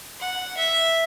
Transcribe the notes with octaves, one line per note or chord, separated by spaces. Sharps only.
F#5
E5